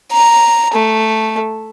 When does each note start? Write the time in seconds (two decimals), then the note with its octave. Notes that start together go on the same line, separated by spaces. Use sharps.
0.12 A#5
0.74 A3